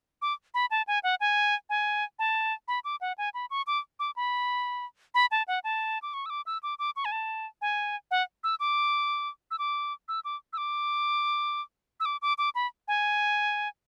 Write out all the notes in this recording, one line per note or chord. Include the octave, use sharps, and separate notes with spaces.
D6
B5
A5
G#5
F#5
G#5
G#5
A5
B5
D6
F#5
G#5
B5
C#6
D6
D6
B5
B5
A5
F#5
A5
D6
C#6
E6
D6
E6
D6
D6
C#6
G#5
A5
G#5
F#5
E6
D6
E6
D6
E6
D6
E6
D6
E6
D6
D6
D6
B5
G#5